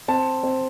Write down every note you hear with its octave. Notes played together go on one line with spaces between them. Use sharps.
C4 A5
C4